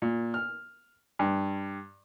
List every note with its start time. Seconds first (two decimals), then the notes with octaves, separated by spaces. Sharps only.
0.02 A#2
0.34 F6
1.19 G2